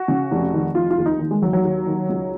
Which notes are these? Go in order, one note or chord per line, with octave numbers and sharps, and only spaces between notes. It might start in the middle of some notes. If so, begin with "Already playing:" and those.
Already playing: F#4
C#3
F1
D#3
F1 F4
F4
D#2
D#4
D#3
G#3
D#2 F#3
F#3
D#2
D#3
C#2